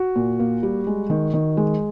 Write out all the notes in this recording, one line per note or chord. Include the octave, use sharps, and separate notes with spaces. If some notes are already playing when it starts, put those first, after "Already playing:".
Already playing: F#4
A#2
A#3
G3
G#3
D#3
D#3
G#3